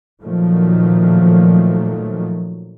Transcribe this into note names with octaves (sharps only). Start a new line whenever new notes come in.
A#2 D#3 F3 F#3 A3